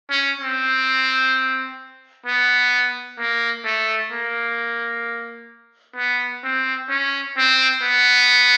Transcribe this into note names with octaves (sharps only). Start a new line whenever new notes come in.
C#4
C4
B3
A#3
A3
A#3
B3
C4
C#4
C4
B3